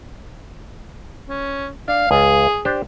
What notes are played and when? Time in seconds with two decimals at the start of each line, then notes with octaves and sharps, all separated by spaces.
1.29 C#4
1.88 D4 F5
2.11 C#2 G#4
2.65 D4 G4 C5